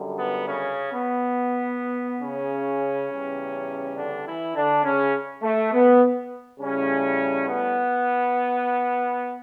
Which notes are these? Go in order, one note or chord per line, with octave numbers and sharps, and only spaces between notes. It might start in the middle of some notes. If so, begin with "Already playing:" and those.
Already playing: F#2 D3 G3
B3
C#3 C#4
B3
C#3 C#4
E2 C#3 G3
D3 D4
E3 E4
D3 D4
C#3 C#4
A3
B3
A2 C#3 G3 C#4
B3